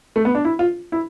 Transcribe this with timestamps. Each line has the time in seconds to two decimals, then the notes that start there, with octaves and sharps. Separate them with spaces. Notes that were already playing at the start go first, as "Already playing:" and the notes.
0.16 A3
0.25 B3
0.35 D4
0.45 E4
0.59 F4
0.92 E4